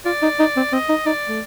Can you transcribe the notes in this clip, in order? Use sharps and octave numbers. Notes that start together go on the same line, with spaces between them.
F4 D5
D#4
D#4
C4
C4 D#5
D#4
D#4 D5
A3